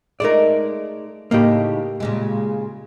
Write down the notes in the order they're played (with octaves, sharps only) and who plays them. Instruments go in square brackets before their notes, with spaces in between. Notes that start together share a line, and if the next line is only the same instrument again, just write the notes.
[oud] G#3 A3 D#4 [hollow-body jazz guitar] A#4 D5
[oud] A2 C#3 D#4 [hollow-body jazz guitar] A#3 G4
[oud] A#2 C#3 G#3